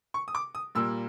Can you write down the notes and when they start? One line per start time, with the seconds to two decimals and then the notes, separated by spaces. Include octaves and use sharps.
0.14 C#6
0.28 D#6
0.35 D6
0.55 D#6
0.75 A#2 G3 A#3 E6